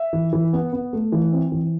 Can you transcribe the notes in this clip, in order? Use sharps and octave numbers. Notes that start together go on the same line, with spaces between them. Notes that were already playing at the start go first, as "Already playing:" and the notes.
Already playing: E5
E3
E3
B3
B3
A3
E3
C4
E3